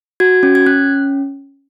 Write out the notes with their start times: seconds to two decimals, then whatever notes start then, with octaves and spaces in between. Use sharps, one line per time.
0.20 F#4 G#6
0.43 C#4
0.55 G#6
0.66 C#4 F#6